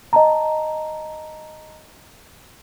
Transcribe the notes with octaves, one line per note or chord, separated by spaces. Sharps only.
D#5 A5 A#5